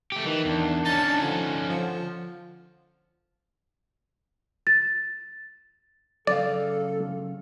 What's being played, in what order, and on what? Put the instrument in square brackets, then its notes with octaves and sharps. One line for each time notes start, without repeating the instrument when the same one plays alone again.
[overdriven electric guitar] A3 G4
[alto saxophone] D#3 [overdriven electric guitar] E3
[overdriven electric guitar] E2 [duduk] D4
[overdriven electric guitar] C#4 D#4 [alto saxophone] A5
[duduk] D3 [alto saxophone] F3
[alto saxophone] F3
[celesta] A6
[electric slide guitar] F#2 C#3 F5 [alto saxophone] A4 [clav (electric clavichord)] D5